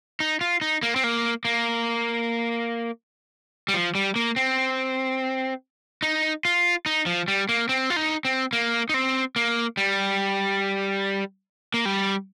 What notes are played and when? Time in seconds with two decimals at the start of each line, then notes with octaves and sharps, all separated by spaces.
0.20 D#4
0.41 F4
0.61 D#4
0.83 A#3
0.96 C4
1.04 A#3
1.45 A#3
3.68 G3
3.74 F3
3.95 G3
4.16 A#3
4.36 C4
6.02 D#4
6.45 F4
6.86 D#4
7.06 F3
7.28 G3
7.49 A#3
7.69 C4
7.90 F4
7.96 D#4
8.25 C4
8.53 A#3
8.89 D#4
8.94 C4
9.36 A#3
9.77 G3
11.74 A#3
11.85 G3